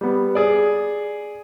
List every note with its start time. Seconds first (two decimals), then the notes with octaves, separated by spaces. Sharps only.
0.01 G3 B3
0.35 G#4 D5